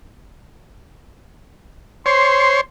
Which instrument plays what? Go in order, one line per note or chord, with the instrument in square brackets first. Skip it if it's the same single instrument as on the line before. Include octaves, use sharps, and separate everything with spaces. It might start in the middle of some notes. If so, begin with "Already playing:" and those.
[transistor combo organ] C5 C#5 [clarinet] C6